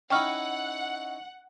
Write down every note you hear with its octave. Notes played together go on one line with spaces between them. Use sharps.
C#4 D#4 E4 F#5 G5 C#6 F6